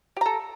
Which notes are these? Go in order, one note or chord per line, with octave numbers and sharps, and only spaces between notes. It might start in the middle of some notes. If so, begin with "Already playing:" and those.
G4 A4 A#5